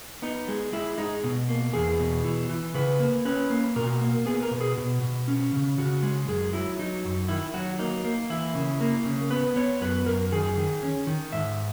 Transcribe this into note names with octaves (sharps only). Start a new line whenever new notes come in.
B3 D#4
G#3
G#3 E4
G#3 D#4
B2
A#3
E2 G#4
B2
E3
E3
C#3 B4
A#3
C#4 B4
A#3
B2 A#4
A#3
B3 G#4
A#4
B2
G#4
B2
B2
C#4
C#3
C#3 F#4
G#3
F#2 G#4
F#3 E4
F#3 D#4
F#2
D#3 E4
F#3 F#4
A#3 D#4
A#3
E3 E4
C#3
A#3
C#3
B3 B4
B3 C#5
F#2 B4
F#2 A#4
D#3 G#4
D#3
C#4
D#3
G#2 E5